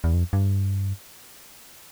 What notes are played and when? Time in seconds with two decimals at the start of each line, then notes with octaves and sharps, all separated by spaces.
0.04 E2
0.14 F2
0.33 G2